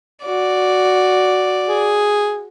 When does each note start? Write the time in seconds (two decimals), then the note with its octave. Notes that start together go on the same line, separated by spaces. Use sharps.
0.25 F#4 D5
1.68 G#4